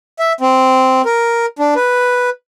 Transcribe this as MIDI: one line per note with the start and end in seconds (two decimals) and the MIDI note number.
0.19 0.33 76
0.41 1.02 60
1.05 1.46 70
1.59 1.74 62
1.76 2.30 71